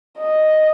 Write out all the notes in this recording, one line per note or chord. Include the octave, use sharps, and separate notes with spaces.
D#5